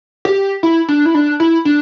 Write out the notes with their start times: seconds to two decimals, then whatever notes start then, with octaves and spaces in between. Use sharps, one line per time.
0.25 G4
0.63 E4
0.89 D4
1.05 E4
1.15 D4
1.40 E4
1.65 D4